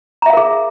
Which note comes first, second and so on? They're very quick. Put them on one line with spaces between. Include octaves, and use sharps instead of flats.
A#5 E5 F5 A#4 G#4